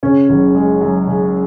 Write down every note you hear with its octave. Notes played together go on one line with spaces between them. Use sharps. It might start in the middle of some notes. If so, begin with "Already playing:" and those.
C#3 C#4
F#1
G#3
F#2
C#3